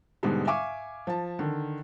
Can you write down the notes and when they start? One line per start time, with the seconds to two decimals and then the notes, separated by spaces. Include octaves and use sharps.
0.23 G#2 B2 D3 G3 G#3
0.47 E5 F5 G#5 C#6 D6
1.07 F3 A5
1.39 D3 D#3